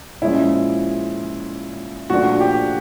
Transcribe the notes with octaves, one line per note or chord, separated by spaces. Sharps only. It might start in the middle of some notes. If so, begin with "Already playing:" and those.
A#2 F3 G#3 C#4 E4
A#2 F3 A3 D4 F#4
G4